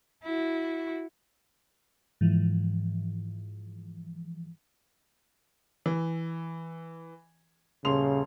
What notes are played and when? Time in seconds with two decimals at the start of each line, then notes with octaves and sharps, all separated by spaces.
0.23 E4 F#4
2.21 G#2 E3 F3
5.86 E3
7.85 D#1 C#3 C6 F7